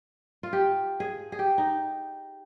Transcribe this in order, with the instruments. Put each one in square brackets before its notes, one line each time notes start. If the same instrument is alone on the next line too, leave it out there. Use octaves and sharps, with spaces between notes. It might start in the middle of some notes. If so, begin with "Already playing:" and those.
[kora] F4
G4
G#4
G#4
G4
D#4